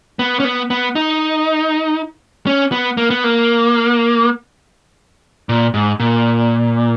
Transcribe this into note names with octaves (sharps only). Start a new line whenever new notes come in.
B3
C#4
B3
B3
D#4
C#4
B3
A#3
B3
A#3
A#2
G#2
A#2